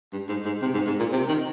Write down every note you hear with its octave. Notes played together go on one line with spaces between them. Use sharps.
G2
G#2
G#2
C3
G#2
G#2
A#2
C3
D#3